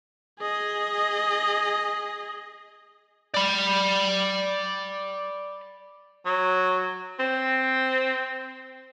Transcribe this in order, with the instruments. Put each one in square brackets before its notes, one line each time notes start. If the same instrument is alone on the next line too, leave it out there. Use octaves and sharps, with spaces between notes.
[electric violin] G#4 D#5
[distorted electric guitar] D5 B5
[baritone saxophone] F#3
C4